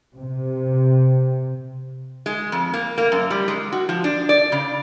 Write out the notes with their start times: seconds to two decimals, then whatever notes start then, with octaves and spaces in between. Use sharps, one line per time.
0.17 C3
2.26 G#3
2.52 F2
2.73 A#3
2.98 A#3
3.12 F#2
3.30 G3
3.48 G#3
3.72 F#4
3.89 F3
4.04 D4
4.29 D5
4.52 C#3